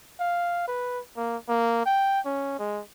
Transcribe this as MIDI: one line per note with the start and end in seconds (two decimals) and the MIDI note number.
0.20 0.63 77
0.68 0.99 71
1.17 1.37 58
1.48 1.81 58
1.86 2.20 79
2.25 2.56 61
2.59 2.81 56